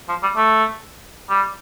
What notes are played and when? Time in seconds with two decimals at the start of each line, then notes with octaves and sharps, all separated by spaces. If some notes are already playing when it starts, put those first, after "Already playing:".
0.09 F3
0.23 G3
0.36 A3
1.30 G3